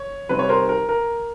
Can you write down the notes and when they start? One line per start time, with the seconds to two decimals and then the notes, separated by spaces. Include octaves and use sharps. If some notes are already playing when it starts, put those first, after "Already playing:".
Already playing: C#5
0.29 C3 D#3 G3 C4 D#4 B4
0.39 C#5
0.49 A#4 C5
0.69 A#4
0.89 A#4